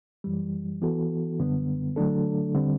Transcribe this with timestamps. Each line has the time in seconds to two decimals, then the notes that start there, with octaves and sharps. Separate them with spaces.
0.24 F#2 E3 G3
0.82 E3 B3 F#4 A4
1.39 F#2 D3 G3 B3
1.96 D3 F#3 A3 D4 A4
2.54 D3 G3 C4